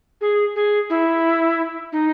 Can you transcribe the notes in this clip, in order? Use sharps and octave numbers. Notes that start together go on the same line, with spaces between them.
G#4
G#4
E4
D#4